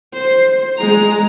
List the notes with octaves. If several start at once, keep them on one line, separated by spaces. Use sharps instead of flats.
C5
G#3 A#5